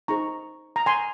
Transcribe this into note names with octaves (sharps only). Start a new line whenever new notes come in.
D#4 G#4 C5 A#5 C#6
A#5
G#5 C6